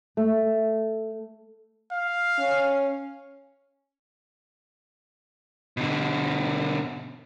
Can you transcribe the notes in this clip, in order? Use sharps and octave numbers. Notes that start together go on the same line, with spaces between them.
A3
F5
C#4
B2 D3